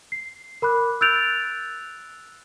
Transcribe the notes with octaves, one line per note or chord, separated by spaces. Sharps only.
C7
A#4 B5 D6 F#6
E6 F#6 G6 A6 D7 F7